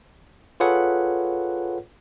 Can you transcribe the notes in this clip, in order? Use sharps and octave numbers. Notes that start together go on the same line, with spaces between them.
F4 G#4 A4 B4 C#5 F#5